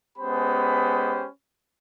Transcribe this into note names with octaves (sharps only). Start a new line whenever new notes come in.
G#3 B3 C#4 G4 C5 B5